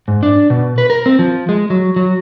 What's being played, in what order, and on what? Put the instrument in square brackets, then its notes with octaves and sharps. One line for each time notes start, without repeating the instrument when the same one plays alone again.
[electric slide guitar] G#2
D4
B2
B4
A#4
C4
F3
G#3
F#3
F#3